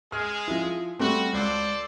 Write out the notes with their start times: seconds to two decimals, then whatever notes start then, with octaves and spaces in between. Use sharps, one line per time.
0.12 G#3 G#4 F6
0.48 F3 E4
0.99 G3 A3 C4 F#4
1.33 C#2 A4 C5 D5